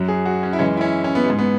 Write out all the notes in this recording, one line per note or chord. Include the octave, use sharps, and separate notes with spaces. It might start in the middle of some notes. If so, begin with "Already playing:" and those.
Already playing: F#2 F#3
G#4
F#4
C#4
E4
F#2 E3 G#3 C#4
E4
C#4
C#4
B3
G#2 G#3
B3